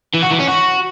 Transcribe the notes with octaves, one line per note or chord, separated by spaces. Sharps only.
E3
F#4
E3
C#4
F#4